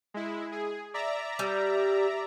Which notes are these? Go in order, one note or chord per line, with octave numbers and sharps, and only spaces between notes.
G#3 E4
G#4
D5 E5 A#5
G3